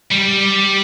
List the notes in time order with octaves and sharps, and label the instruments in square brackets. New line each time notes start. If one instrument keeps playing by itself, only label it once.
[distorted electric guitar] G3